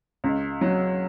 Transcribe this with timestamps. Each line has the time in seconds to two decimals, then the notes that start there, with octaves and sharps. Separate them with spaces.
0.24 C#2
0.61 F#3